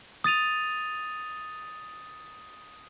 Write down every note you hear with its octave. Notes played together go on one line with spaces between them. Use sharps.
D#6 A6 D#7 F7